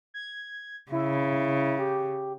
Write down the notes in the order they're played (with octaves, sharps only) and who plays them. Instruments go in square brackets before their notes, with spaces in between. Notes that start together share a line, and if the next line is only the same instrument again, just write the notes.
[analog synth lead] G#6
[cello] C#3 [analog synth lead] E4
[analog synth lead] G4